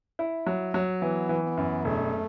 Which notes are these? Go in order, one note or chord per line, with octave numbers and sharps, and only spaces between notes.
E4
F#3
F#3
E3 B3
E3
B3
F#2
E1 A3